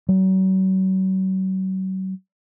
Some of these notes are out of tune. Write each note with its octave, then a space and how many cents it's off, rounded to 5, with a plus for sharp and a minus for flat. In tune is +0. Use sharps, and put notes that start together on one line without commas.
F#3 +40